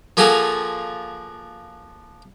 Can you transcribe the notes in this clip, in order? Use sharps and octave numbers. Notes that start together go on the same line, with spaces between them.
F3 A#3 F4 F#4 G#4 A4